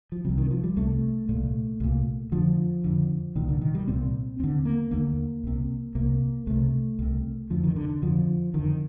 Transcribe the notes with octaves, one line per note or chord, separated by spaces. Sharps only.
F3
C2 C3 G3
D#3
F3
G3
C2 C3 A3
C2 A#2 A3
C2 A#2
F2 D3 F3
F2 D3
C2 A#2 D#3
D3
D#3
G3
C2 A#2 C4
D#2 D3 C4
A#3
D#2 D3 A#3
C2 C3
C2 C3 A#3
C2 C3 A3
C2 C3
F2 D3 F3
D#3
D3
D3
F2 D3 F3
F2 D3 D#3